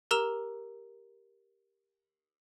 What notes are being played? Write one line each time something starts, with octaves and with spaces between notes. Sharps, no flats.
G4 A#4 A#5 E6 E7 F7